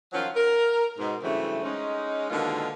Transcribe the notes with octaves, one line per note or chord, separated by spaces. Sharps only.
D#3 F3 F#3 C#4 F4
A#4
G#2 B2
G2 C#3 E3 F#3 A3 C4
G#3 C#4 D#4
B2 D3 D#3 G#3 A#3 F4